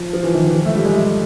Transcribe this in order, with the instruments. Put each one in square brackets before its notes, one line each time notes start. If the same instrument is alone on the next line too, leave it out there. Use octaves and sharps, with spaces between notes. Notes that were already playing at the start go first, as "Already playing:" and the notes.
Already playing: [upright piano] F3
F3
E3
D#3
E3
F3
A3
G3
G#3
A3